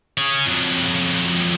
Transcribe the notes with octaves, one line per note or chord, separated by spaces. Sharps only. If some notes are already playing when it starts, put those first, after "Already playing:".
C#4 G#4
F2 F#3